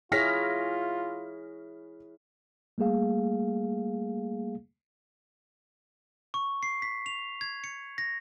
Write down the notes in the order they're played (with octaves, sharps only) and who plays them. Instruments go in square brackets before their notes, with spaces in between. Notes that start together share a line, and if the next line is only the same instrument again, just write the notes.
[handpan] E4 G#4 C#5 [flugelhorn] F4 [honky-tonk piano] F6 A#6 B6
[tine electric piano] G3 A3 A#3 G#4 F5
[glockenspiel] C#6
C7
B6
F7
G#6
C#7
A#6